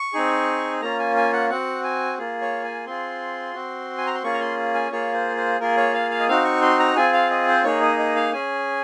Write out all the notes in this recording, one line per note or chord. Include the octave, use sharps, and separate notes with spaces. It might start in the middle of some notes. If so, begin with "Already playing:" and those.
Already playing: C#6
C4 D#4 G#4
A#3 C#4 F4 A#5
G#5
G#5
F#5
C4 F#4 F#5
G#5
A#3 F4 G#4
C#5
G#5
C4 F4 G#4 C6
C4 F#4
G#5
A#5
C6
A#3 C#4 F4 G#4 C#6
A#5
C6
G#5
A#3 F4 G#4 C#5
C5
C5
A#3 F4 G#4 A#4
C#5
F5
F5
D#5
C4 D#4 F#4 F5
C#6
C6
A#5
C4 F4 G#4 G#5
F5
D#5
C5
A#3 D#4 G#4 C#5
D#5
D#5
F5
C#4 G#4 G#5